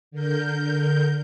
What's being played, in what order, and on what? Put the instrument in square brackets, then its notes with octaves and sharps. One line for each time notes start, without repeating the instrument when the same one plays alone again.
[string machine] D3 A#4 G6